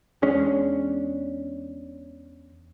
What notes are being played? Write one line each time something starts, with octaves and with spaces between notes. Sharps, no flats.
E2 G#3 C#4 D4